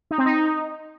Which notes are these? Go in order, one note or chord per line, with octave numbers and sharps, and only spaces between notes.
D#4
C4
D#4